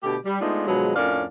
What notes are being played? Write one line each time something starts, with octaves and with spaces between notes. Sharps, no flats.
B2 D3 A3 G4
G3
G#3 A3 B3 D4 D#4 F4
B2 D3 F3 F#3 G#3
F2 A2 C#4 D4 A#4 F5